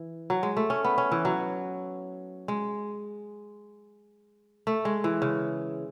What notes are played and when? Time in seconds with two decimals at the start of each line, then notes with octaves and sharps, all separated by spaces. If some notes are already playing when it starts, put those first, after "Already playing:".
Already playing: E3
0.30 F#3
0.43 G#3
0.57 A3
0.70 C#4
0.85 B3
0.98 C#4
1.12 E3
1.25 F#3
2.48 G#3
4.67 A3
4.85 G#3
5.04 E3
5.22 C#3